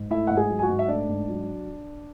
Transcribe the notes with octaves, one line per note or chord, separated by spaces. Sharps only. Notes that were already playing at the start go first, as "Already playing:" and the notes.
Already playing: G#2
A3 E4 E5
G#2 F#5
G#4 G#5
F#3
G#5
F#4 F#5
G#2
E5
A3 D4 D5
G#2
F#3